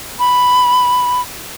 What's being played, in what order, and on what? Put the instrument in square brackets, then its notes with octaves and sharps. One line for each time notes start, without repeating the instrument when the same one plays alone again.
[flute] B5